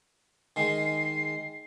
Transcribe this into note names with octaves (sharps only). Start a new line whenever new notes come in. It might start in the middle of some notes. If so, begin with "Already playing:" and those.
D#3 G#3 C7